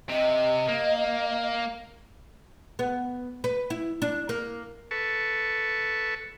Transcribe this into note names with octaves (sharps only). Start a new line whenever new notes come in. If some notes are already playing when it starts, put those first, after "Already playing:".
C3 D#5
A#3
B3
B4
E4
D4
A#3
A4 B4 A5 C#6